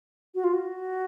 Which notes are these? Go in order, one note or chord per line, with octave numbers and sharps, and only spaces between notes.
F#4
F4
F#4